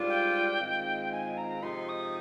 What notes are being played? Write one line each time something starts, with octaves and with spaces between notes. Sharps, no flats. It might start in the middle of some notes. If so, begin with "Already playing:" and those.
Already playing: G#2 G3 D4 F4
G5
G#2 D#3 G#3 C4 F4
G#5
A#5
C3 F3 G#3 D#4 C6
D#6